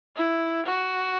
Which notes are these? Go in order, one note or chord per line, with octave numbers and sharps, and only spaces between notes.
E4
F#4